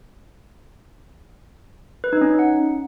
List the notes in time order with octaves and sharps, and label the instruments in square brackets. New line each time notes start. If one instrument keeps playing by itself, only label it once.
[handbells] B4
D#4
C#4
D#4
F#5